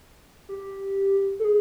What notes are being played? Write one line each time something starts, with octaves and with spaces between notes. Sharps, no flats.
G4
A4
G#4